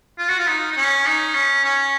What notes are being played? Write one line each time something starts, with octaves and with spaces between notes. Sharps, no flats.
F4
F#4
F4
D#4
D#4
C#4
D#4
C#4
C#4